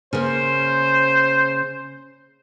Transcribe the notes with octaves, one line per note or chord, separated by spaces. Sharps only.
C#3 A#3 C5